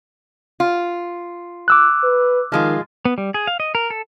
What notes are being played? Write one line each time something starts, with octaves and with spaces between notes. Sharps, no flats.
F4
D6 E6 F#6
B4
D#3 F3 G#3 F4
B3
G3
G#4
F5
D#5
A#4
A4